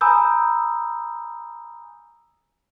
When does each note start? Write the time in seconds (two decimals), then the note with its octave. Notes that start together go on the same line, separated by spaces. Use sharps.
0.01 G#5 A#5 B5 D#6 E6 G6